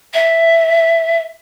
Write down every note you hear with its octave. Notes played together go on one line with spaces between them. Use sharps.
E5